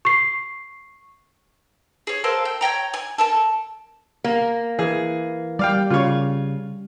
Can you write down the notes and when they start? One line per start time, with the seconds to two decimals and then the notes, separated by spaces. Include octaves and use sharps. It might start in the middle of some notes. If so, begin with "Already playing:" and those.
0.05 C#6 C7
2.07 G#4 C#5
2.24 A4 A#4 C5 F5
2.45 G5
2.61 C#5 D#5 G5 A#5
2.94 G#5
3.18 A4 A#4 A5
4.24 A#3
4.79 E3 G#4
5.59 G3 D5 F5 G5
5.90 C#3 F4 C#5